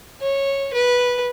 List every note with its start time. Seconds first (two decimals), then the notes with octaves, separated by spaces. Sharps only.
0.21 C#5
0.73 B4